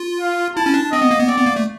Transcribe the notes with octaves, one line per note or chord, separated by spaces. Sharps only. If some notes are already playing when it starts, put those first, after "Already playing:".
Already playing: F4
F5
E4 A5
C#4
D4
C4 D#5
B3
A#3
B3
C4 D5
B3
A#3
A3